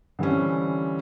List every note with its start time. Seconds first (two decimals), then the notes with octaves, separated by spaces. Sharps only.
0.19 D3 E3 G3 C4 C#4